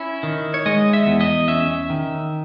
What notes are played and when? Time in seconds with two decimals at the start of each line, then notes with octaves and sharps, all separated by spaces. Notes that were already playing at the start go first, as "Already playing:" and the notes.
Already playing: C#4 E4
0.23 D#3
0.54 C#5
0.66 G#3 D#5
0.93 E5
1.07 E2
1.21 D#5
1.48 C#4 E5
1.90 D#3